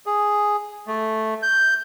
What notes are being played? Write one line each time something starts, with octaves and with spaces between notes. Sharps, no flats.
G#4
A3
G6